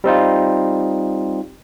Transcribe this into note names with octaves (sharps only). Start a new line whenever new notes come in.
G3 C4 D#4 F4